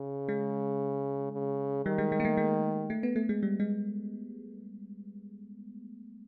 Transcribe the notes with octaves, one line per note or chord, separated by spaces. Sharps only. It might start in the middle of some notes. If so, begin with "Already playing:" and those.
Already playing: C#3
G#3
C#3
D#3 G3
G#3
G#3
A#3
A3
G#3
A3
B3
A3
G#3
G3
G#3